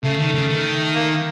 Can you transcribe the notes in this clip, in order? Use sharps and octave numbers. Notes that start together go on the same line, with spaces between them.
C#3 A3
D#3
C#3
D#3
A#3